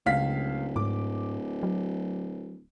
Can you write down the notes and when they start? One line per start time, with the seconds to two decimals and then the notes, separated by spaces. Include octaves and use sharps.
0.06 D1 C#2 F5 B6
0.76 G#2 D6
1.63 F#3